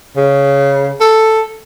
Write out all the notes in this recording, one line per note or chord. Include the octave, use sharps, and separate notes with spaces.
C#3
A4